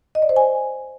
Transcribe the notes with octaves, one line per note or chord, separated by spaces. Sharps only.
D#5
D5
C5
G#5